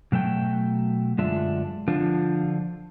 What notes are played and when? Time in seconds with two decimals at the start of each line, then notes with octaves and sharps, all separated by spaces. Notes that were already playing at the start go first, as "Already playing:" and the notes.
0.12 B2 F#3 A3 G5
1.18 F#2 D3 G#3 D4 F4 E5
1.88 D3 F3 D4 F4